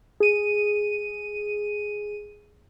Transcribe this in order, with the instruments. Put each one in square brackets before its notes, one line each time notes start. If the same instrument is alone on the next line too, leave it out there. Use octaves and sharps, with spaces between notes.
[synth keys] G#4 D#7